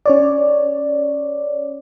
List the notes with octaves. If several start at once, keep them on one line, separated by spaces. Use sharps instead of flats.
C#4 C#5 D5